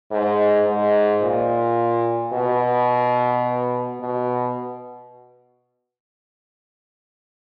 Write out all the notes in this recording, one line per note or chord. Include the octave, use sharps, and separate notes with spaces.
G#2
G#2
A#2
B2
B2